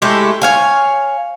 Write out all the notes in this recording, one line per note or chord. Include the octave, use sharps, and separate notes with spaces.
A2 G#3 A3 G4
C#5 F5 G#5